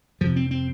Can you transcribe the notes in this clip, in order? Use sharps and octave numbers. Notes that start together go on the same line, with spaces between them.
F2 C3 F3
C4
C4